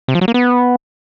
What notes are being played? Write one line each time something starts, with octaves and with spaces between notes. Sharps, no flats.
C3
F3
F#3
A#3
B3